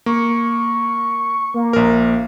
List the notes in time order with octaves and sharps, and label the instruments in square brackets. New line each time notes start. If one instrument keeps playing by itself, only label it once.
[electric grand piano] A#3 [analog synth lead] C#6
[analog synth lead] A#3
[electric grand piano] A#1 A#4